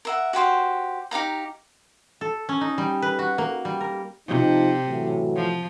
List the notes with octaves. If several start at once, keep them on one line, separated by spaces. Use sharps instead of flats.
A#4 E5 F#5
F#4 G4 C5 F5
D#4 G4 F5 A#5
A4
C#4
D#4
G3
B4
F#4
A#3
G3
A#4
C3 F3 D#4
A2 E3 F#3
F3